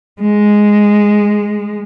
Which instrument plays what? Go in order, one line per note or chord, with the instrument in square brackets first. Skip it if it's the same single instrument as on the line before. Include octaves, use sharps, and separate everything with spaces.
[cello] G#3